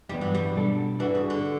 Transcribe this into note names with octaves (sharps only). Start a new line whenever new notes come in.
G2 E3 G3 B3
F#3
G3
B2 G3 D4 A4
E3 G3 D4 F#4
C#3
D3